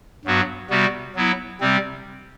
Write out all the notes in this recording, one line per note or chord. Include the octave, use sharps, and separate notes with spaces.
G2 F#3 B3 F#4
C3 G3 B3 F#4
F#3 B3 E4
C3 G3 C4